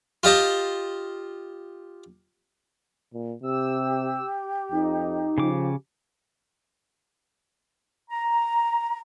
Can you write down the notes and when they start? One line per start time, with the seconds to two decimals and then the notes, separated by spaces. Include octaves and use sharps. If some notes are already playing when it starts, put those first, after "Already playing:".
0.23 F4 G4 D#5 A5
3.14 A#2
3.43 C3 G4 E6
4.72 F2 D#4
5.38 C#3 F3 D6
8.11 A#5